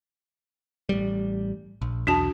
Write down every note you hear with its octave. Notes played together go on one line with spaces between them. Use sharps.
A1 G3
A#1
B1 E2 D4 F#4 A5